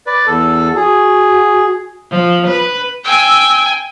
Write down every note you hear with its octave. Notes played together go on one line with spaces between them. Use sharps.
B4 D5
E2 A4
F#4 G#4
F3
B4
G5 G#5 E6